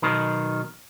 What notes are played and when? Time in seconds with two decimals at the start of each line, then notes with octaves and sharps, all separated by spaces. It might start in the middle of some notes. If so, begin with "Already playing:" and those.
0.02 B1 B2 D#3 C5